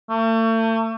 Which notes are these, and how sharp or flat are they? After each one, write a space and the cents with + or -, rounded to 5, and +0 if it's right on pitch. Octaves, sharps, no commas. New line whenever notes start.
A3 +40